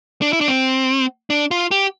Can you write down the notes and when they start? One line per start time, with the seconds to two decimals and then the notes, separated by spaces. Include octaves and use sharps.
0.22 D4
0.33 E4
0.41 D4
0.48 C4
1.30 D4
1.51 F4
1.71 G4